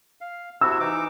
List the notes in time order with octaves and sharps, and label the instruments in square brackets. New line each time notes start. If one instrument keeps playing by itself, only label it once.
[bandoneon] F5
[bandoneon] C3 E4 F#4 [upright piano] E6
[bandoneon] E3 D#4 D6